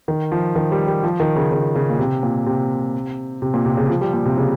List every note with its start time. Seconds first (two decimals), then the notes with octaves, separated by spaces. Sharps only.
0.08 D#3
0.32 F3
0.56 D#3
0.72 G3
0.87 G3
1.03 F3
1.20 D#3
1.36 C#3
1.51 C#3
1.75 C#3
1.90 A#2
1.99 C3
2.23 A#2
2.46 C3
3.42 C3
3.54 A#2
3.65 C3
3.77 C#3
3.90 F3
4.01 G3
4.13 A#2
4.26 C3
4.37 C#3